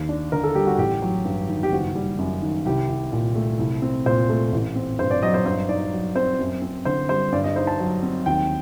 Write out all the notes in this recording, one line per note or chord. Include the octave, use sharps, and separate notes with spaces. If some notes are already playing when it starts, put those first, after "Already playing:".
Already playing: D#2
D4
D3 A#4
A4
G3 G4
F#4
A1 G4
F#3
G2
D#3
G4
F#1 F#4
G3
F#2
D#3
C2 G4
C2
A#2
A3
C2
C4
A#2 C5
A3
A1
C4
G2 C5
D5
F#3 D#5
C5
G2 C5
D#4 D5
F#3
C4 C5
F#2
C4
D3 C5
G3 C5
G2 D5
D#5
D#4 C5
A5
F#3
C4
D#2 G5